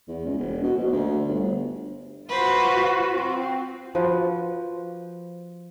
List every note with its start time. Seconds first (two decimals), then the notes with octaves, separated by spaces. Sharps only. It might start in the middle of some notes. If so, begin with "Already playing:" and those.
0.08 E2
0.26 C#2
0.38 E1
0.63 B2
0.77 A#1
0.92 D2
1.28 G1
2.28 F4 F#4 B4 C5
3.12 C4
3.95 F3 F#4 B4